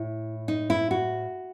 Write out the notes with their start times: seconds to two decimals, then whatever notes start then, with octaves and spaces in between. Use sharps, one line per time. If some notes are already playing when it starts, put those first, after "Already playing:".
Already playing: A2 E4
0.48 D#4
0.70 E4
0.91 F#4